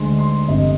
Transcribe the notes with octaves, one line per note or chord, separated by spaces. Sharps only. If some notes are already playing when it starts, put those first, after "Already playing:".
Already playing: D2 D3 G#3 C6
C6
G1 F2 C3 D#5